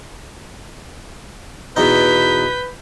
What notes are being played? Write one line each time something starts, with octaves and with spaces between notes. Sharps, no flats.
E2 B2 D#4 B4 G6 B6